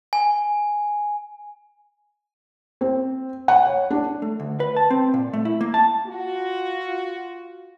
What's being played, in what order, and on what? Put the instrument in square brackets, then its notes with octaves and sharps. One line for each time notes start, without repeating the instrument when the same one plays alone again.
[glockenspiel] G#5
[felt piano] C4
F#5
C#5
D4
[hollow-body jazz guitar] A3
D2
B4
A5
C4
A#2
A3
E4
A#3
A5
[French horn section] F4 F#4